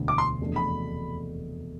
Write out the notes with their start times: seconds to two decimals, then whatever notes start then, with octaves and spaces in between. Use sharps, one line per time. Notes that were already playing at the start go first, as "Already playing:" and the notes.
Already playing: E1 D2 D3
0.08 D6
0.18 C6
0.40 F1 E2 B2 A3 D4
0.56 B5